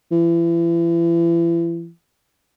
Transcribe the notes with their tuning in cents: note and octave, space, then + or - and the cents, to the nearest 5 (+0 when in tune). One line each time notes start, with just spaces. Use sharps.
E3 +35